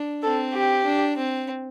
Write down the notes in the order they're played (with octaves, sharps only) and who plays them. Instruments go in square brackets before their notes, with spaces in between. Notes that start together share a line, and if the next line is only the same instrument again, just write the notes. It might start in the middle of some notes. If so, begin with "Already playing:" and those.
Already playing: [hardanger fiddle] D4
[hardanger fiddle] C4 [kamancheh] A4
[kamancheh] G4
[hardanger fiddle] D4
C4